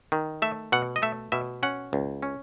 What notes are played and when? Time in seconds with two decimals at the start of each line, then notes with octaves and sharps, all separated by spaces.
0.12 D#3
0.42 A3 E5
0.72 B2 F#5
0.96 D#5
1.02 A3 E5
1.32 B2 E5
1.63 C#4 F#5
1.93 C#2
2.22 C#4